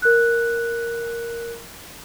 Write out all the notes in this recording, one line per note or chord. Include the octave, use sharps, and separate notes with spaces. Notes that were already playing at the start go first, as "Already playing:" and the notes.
A#4 F#6